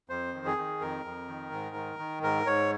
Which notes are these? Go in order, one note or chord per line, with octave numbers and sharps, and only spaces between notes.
F2 C5
D#3
G#4
D#3
F2 A#4
F2
D#3
G#2
D#3
D#3
G#2 A#4
G#2 C#5